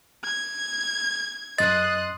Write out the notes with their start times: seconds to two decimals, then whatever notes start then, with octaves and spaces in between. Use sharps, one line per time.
0.24 G#6
1.58 F#2 D#5 C6 D#6 F#6 A6